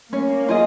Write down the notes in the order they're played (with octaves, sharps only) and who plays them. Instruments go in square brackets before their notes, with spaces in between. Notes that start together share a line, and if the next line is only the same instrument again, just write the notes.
[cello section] A#3 [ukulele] C#4
[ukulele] F4 G#4 D#5